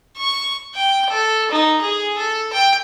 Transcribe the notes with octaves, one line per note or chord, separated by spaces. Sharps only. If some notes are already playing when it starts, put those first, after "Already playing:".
C#6
G5
A4
D#4
G#4
A4
G5